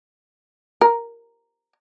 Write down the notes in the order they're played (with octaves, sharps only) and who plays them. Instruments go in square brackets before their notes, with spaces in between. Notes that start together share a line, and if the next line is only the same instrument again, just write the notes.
[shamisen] A#4